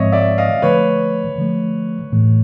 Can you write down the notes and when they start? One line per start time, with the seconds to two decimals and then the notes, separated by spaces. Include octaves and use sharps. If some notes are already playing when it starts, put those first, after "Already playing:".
Already playing: G#2 F3 G#3 C4 C#5 D#5 E5
0.12 D5 E5
0.38 D#5 F5
0.62 D3 F3 A3 B4 C#5
1.38 D3 F3 A3
2.12 A2 E3 A3